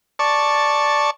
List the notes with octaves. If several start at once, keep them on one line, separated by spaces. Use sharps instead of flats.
D5 A5 C#6